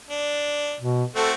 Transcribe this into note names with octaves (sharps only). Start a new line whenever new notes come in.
D4
B2
A3 C4 F#4 A4